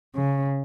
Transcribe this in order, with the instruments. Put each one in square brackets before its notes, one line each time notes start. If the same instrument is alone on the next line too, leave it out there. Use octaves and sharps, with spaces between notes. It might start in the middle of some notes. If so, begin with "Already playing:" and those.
[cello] C#3